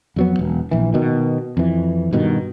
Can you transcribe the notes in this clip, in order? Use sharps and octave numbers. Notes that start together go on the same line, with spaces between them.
F2 F#3 B3
E1
A#1 E3
B2 D#3
F2 E3
G2 B2 D#3